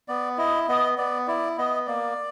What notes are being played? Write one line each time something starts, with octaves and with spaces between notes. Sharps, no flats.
B3 D5
E4 D#5
B3 D#5
B3 D5
E4 D5
B3 D#5
A#3 D5